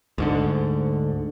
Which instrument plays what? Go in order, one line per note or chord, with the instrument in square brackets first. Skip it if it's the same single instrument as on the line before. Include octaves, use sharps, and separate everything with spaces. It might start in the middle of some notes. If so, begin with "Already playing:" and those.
[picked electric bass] D2 G#2 D3